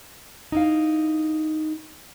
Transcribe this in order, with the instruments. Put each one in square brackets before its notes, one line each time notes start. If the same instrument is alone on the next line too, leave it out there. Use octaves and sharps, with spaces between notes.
[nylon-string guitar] D#4 E4 F5